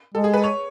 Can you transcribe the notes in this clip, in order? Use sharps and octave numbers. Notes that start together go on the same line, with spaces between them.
G#3 A4
G#4
B4
C#5